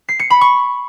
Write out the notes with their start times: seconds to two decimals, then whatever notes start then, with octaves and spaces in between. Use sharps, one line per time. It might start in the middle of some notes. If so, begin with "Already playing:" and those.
0.09 C7
0.20 C#7
0.30 B5
0.41 C#6